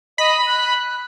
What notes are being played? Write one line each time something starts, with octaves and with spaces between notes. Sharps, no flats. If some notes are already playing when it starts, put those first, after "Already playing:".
D#5 B5
F#6